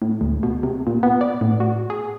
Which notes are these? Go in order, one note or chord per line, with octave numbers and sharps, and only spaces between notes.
A2
D2
B2
C3
A#2
B3
D5
A2
F#4
G#4